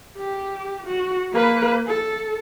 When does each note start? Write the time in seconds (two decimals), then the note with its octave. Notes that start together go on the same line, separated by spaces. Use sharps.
0.17 G4
0.86 F#4
1.32 A#3 B4
1.87 A4